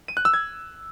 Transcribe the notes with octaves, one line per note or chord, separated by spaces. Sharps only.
D#7
F#6
E6
G#6